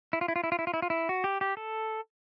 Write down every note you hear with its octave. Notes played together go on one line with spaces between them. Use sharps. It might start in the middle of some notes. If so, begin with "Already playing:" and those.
E4
F4
E4
F4
E4
F4
E4
F4
E4
F4
E4
F#4
G4
G4
A4